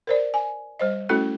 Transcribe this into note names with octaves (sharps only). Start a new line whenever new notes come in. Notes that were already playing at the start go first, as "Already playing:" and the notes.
A#4 C5 D5
G#5
G3 C5 D#5
A3 C#4 E4 F#4 A4